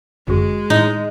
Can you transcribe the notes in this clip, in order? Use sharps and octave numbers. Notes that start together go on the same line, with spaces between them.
G1 F#2 G#3 F#4
A2 D#4